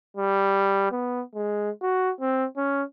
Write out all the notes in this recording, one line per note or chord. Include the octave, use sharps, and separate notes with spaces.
G3
B3
G#3
F#4
C4
C#4